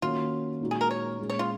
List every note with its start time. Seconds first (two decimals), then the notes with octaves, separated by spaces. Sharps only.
0.02 D#3 A#3 C#4 F4 F#4
0.61 A#2 G#3 D#4 F#4
0.71 G#4
0.81 A#4
0.91 C#5
1.19 A#2 G#3 C#4
1.30 C#5
1.39 F4